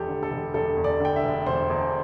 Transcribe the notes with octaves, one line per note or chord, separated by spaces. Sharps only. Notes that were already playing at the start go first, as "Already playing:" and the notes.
Already playing: E1 E2 G4 A4
D3
A4
E1
E1 A4
E2
D5
D3 G5
E5
E1
E1 C5
E2